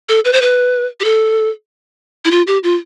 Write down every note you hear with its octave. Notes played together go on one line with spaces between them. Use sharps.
A4
B4
C5
B4
G4
A4
E4
F4
G4
F4